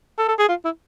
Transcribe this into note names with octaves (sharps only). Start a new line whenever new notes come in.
A4
A4
G#4
F4
E4